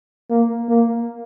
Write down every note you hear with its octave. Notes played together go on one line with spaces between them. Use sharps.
A#3
A#3